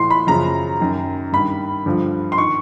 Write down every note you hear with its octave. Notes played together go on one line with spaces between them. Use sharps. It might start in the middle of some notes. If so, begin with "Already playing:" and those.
Already playing: A2 E3 C6
B5
F#2 C#3 F3 A#5
F#2 D#3
G2 D#3 B5
G2 D3 F3
C6
D#3 C#6